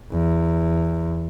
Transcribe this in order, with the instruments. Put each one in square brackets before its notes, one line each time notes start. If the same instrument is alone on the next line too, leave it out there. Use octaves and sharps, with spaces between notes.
[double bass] E2